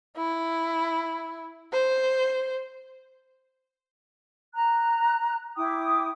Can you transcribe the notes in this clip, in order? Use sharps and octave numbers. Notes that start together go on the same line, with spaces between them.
E4
C5
A#5 F#6
E4 G5 D6 D#6